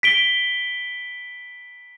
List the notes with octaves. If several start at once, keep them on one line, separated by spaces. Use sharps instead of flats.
B6 D7 G7